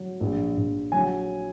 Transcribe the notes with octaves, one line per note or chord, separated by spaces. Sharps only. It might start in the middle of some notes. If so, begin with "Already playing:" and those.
Already playing: F#3
A#1
A#1
F#3 G#5